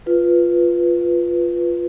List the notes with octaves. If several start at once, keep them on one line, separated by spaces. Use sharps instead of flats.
F4 B4